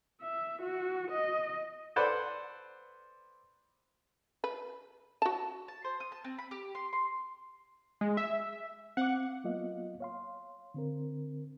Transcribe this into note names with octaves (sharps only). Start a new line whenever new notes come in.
E5
F#4
D#5
A4 B4 C5 D5 F#5 B5
B4
F#4 A5
A5
C5
D#6
A5
C4
B5
G4
C6
C6
G#3
E5
C4 F5 F#5 D6
F#3 A#3 B3 F4 D#5 F5
C#5 F5 C6
D3 C4 A#4